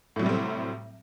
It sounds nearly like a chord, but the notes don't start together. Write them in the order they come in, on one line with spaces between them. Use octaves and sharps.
A2 F#3 C3 G3 C4